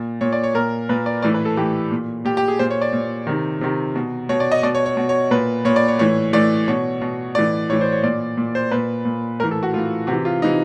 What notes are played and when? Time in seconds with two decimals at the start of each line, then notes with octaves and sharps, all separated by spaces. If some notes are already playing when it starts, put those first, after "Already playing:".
Already playing: A#2
0.21 A#2 C#5
0.32 D5
0.44 C#5
0.54 A#2 A#4
0.89 A#2 B4
1.06 D5
1.22 A2 E3 D5
1.34 B4
1.45 A4
1.57 A2 E3 G4
1.91 A#2
2.25 A#2 G4
2.37 G4
2.48 G#4
2.59 A#2 C5
2.70 C#5
2.81 D5
2.93 A#2
3.27 C3 D#3
3.61 C3 D#3
3.96 B2
4.29 B2 C#5
4.40 D5
4.52 D#5
4.63 B2 D5
4.75 C#5
4.86 C#5
4.97 B2
5.09 C#5
5.31 A#2 B4
5.65 A#2 C#5
5.76 D5
5.88 C#5
5.99 A2 E3 C#5
6.33 A2 E3 D5
6.68 B2 C#5
7.02 B2
7.35 A2 E3 D5
7.69 A2 C#5
7.73 E3
7.81 C5
7.92 C#5
8.03 A#2 D5
8.37 A#2
8.55 C5
8.71 A#2 B4
9.05 A#2
9.39 A2 A#4
9.44 E3
9.51 A4
9.63 F#4
9.73 A2 E3 F4
10.07 C3 E3 F#4
10.25 F4
10.42 C3 E3 D#4